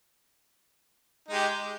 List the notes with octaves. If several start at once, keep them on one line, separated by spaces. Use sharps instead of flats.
G#3 D#4 G4